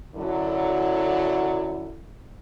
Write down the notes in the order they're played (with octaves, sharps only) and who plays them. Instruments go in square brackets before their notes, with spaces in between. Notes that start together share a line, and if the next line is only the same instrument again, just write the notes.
[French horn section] F#2 D3 F#3 E4 A4